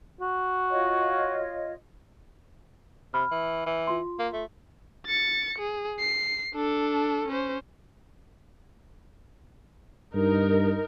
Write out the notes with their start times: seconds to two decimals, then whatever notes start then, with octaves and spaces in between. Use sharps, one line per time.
0.21 F#4
0.69 F4 C#5 D#5
3.14 C3 B5 F6
3.31 E3
3.66 E3
3.87 F4 C6
4.19 A#3
4.33 A3
5.06 A6 C#7
5.59 G#4
6.00 C7
6.54 D4 A4
7.28 C#4 C5
10.14 G2 D#4 A#4